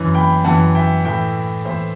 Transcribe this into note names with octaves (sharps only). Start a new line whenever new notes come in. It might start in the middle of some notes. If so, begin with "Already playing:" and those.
Already playing: F#2 E3
G5 B5
F#2 E3 F#5 A5
E5 G5
A2 E3 E5 G5
A2 E3 C5 E5